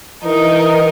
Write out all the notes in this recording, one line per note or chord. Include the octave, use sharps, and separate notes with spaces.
E3 D#4 A#4 D#5